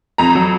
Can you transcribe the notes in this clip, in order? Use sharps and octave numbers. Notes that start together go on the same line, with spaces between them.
F2 A#5
F#3